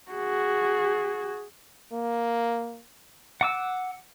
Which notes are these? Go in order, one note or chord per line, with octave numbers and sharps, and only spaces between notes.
F#4 G#4
A#3
F#5 D6 E6